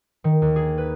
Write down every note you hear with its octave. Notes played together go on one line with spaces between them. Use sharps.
D#3
D#2
G#4
B4